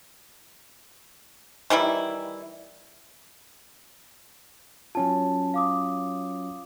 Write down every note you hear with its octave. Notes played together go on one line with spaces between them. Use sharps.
D#3 E3 G3 E4
F#3 C#4 F4 A5
F5 D6 D#6